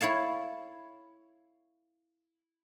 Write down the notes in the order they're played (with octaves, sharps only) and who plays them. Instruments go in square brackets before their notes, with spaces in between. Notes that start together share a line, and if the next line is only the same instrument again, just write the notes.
[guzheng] E4 C#5 F5 A5